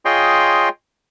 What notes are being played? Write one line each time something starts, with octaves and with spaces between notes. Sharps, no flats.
F4 G#4 C#5 D#5 G5 C6